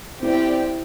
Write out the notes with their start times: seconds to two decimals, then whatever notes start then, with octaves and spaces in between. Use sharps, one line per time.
0.22 C4 E4 G4 D5 G5